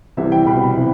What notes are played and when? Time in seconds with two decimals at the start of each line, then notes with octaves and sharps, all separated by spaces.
0.17 C2 C3 E3 E5
0.32 G5
0.46 C2 B2 B5
0.77 C3 E3